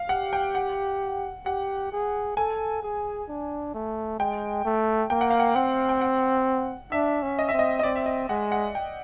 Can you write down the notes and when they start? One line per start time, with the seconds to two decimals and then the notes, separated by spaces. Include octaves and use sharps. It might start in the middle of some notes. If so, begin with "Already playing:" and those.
Already playing: F5
0.09 G4 F#5
0.33 G5
0.55 F#5
1.46 G4 F#5
1.92 G#4
2.37 A4 G#5
2.83 G#4
3.29 D4
3.74 A3
4.19 G#3 G5
4.65 A3
5.10 A#3 G5
5.21 F#5
5.30 F5
5.40 F#5
5.55 C4 F#5
5.89 G5
6.01 F#5
6.92 D4 E5
7.22 C#4
7.39 D#5
7.49 C4 E5
7.59 D#5
7.79 D#5
7.83 C4 D5
7.95 E5
8.06 D#5
8.29 G#3 F#5
8.52 F#5
8.75 G5